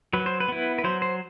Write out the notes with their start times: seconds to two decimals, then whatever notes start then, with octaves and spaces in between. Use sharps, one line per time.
0.13 F#3 B4
0.26 C5
0.40 B4
0.48 B3 E4
0.78 B4
0.84 F#3 C5
1.02 C5